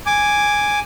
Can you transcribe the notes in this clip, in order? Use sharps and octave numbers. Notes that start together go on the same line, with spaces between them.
G#5 D6